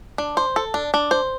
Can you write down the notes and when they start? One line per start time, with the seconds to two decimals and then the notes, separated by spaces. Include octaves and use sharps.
0.18 D4
0.37 C5
0.56 A4
0.74 D4
0.94 D4
1.11 C5